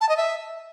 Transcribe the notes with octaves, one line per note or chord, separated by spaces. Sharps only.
A5
D#5
E5